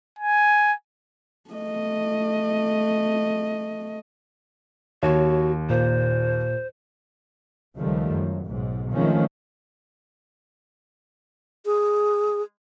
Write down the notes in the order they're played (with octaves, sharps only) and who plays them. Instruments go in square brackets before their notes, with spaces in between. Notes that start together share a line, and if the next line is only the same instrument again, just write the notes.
[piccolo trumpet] G#5
[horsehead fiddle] A3 D#5
[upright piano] D#2 [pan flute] F#4 [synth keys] C#5
[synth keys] A#2 [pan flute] C5
[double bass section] C#2 D#3 F3 G3 A3
F#2
B1 G#2
D#3 F3 G#3 A3 C4 C#4
[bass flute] G#4